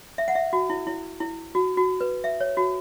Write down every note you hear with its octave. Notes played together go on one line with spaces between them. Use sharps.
E5
F#5
E5
F#4
E4
E4
E4
F#4
F#4
B4
E5
C#5
F#4